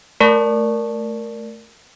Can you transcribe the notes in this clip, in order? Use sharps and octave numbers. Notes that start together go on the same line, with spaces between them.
A3 A#4 D5 A5 C#6